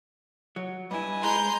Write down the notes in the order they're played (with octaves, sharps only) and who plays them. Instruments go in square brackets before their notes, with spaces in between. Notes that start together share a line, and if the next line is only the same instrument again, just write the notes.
[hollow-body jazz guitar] F#3
[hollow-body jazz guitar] G2 E4 [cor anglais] B4 [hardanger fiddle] D#5 G#5
[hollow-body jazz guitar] G#3 [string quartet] A#5 C6 G6